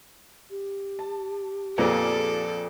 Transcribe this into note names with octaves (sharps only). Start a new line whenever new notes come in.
G4
A5
F2 A#2 F3 B3 F4 G#4 A4 D5